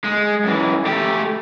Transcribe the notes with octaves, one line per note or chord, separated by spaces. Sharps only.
G#3
F#2 E3
A3 G4